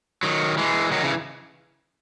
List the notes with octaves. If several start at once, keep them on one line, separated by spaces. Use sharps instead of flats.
D#3 F#3
E3 G#3
D#3 F#3
C#3 E3